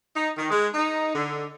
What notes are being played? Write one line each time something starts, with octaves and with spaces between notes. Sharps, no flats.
D#4
D#3
G#3
D#4
D3